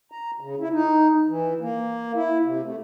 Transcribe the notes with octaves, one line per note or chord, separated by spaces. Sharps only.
A#5
C#3
E4
D#4
E3
A#3
E4
C3
A3